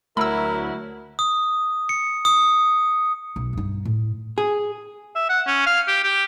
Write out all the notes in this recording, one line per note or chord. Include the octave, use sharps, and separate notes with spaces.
D2 F#3 A3 E4 A#4 B5 E6
D#6
C#7
D#6
B1
G2 D#4
A2
G#4
E5
F#5
C#4
F5
G4
G4